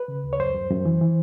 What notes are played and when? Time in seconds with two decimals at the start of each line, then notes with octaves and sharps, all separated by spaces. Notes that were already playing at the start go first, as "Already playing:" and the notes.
Already playing: B4
0.08 C#3
0.24 D2
0.33 C#5
0.39 F#2 C5
0.54 F#2
0.70 F#2
0.85 E3
1.01 E3